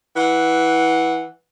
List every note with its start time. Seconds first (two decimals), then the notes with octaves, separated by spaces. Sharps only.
0.15 E3 F#5